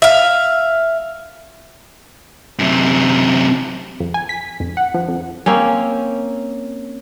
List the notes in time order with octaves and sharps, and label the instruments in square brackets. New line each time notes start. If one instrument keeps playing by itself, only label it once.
[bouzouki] E5 F5
[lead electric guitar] F#2 C3
[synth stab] F2
G#5
B6
F2
F#5
F3
F2
[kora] A#3 C4 C#4